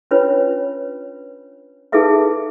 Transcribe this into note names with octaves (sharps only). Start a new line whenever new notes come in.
C#4 D4 F4 B4 C#5
D#4 G#4 A4 B4 E5 F5